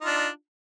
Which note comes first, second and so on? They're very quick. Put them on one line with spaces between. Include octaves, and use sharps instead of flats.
D#4 F4 D4